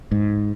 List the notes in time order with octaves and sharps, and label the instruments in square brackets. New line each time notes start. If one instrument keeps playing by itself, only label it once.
[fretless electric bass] G#2